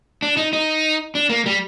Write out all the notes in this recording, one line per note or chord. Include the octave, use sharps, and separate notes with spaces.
D4
D#4
D#4
D4
A#3
G3